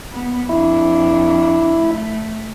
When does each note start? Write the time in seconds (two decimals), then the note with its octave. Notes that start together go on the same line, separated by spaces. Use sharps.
0.12 B3
0.49 F2 D4 E4
1.80 A3